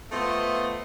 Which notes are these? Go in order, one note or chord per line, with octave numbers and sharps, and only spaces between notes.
A3 B3 F4 C5 D#5 E5